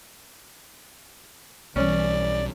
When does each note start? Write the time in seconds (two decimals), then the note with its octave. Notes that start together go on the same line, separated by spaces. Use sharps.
1.76 B1 E3 G3 C#4 D5